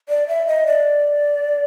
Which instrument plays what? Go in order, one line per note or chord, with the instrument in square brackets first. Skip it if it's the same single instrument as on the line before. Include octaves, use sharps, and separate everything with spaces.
[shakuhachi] D5
E5
D#5
D5